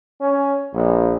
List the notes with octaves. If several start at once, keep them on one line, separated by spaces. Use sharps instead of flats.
C#4
A#1